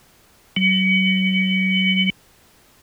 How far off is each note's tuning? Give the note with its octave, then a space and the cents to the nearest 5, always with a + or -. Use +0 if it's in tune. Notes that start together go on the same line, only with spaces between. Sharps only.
F#3 +35